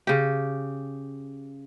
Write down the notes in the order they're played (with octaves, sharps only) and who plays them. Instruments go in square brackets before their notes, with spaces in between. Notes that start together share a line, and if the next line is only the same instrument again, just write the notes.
[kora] C#3 G4